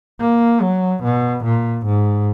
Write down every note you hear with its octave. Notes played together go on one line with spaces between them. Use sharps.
A#3
F#3
B2
A#2
G#2